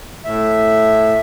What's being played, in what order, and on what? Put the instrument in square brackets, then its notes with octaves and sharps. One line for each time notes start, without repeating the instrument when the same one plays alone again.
[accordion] A2 E5